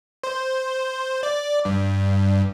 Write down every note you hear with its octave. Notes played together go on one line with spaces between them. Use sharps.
C5
D5
G2